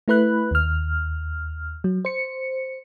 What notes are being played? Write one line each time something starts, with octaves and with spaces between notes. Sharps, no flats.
A3 E4 B4 B5 F#6
D#2 F6
F#3
C5 C#7